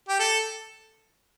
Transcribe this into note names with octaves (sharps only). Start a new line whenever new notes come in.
G4
A4